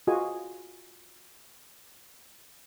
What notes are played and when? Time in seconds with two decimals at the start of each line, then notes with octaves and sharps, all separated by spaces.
0.07 F4 F#4 G#4 D#5 G#5